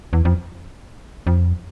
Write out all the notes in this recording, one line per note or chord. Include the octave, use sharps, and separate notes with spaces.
E2
F2
F2